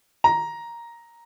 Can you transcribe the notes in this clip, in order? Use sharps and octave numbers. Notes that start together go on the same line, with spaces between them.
A#5